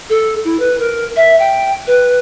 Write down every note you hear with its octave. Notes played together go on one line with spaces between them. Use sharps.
A4
E4
B4
A#4
E5
G5
B4